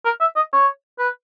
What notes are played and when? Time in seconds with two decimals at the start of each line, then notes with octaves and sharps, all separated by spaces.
0.05 A#4
0.21 E5
0.36 D#5
0.53 C#5
0.99 B4